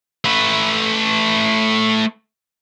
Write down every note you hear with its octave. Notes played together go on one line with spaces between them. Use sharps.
A3 B4